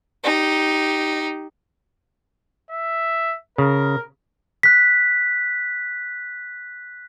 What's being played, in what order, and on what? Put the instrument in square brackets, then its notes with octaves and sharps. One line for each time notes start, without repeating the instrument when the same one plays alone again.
[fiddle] D#4 G4
[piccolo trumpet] E5
[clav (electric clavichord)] C#3 [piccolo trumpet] A#4
[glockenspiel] F#6 B6